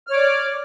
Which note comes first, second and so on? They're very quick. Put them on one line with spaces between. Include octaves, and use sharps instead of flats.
F6 C#5 D6 D5